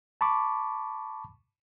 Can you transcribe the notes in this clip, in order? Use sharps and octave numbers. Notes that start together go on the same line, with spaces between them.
A5 B5 C#6 D6